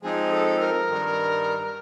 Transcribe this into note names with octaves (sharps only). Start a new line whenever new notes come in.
F3 G#3 C4 D#4 G#4
A4
A#4
G2 D#3 G3